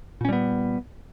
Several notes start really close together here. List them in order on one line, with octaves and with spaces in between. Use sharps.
A#2 C#4 G3 B3